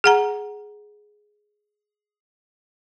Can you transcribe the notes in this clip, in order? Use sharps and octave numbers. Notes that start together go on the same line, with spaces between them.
G#4 F#5 A#5